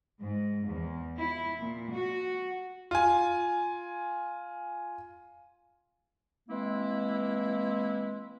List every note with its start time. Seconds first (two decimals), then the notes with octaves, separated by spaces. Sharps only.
0.22 G#2
0.66 E2
1.19 E4
1.61 A#2
1.93 F#4
2.91 F4 G#5
6.48 E3 G#3 A#3 C4 E4